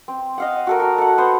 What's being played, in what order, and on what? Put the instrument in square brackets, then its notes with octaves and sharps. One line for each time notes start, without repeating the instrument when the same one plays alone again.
[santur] C4
D#5 F5 F#5
F#4 A4 A#4
F#4 A#5
A4 F#5
B3 C5 F#5